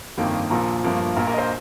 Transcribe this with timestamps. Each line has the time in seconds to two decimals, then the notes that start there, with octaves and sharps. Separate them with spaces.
0.17 G1 F2 D#3 A#3 G5
0.50 A#1 A#2 F3 A#5
0.83 G1 G2 F3 A#3
1.16 A#1 A#2 A#3 A#4
1.27 A#4
1.33 D#5
1.38 C5